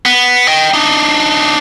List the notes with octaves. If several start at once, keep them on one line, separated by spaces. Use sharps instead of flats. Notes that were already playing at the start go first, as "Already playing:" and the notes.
B3
D#5 G5
D4 D#4